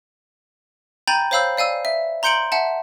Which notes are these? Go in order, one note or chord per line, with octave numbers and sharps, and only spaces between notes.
G5 G#5 A#5 B5 G6 A6
C5 C#5 F5 B5 E6 G6
D5 F5 G#5 E6
E5
A#5 C6 G6 C#7 D7 F#7
E5 F#5 A5